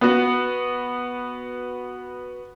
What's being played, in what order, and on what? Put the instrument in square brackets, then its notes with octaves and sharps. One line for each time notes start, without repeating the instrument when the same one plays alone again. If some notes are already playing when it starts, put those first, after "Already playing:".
[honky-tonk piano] B3 F#4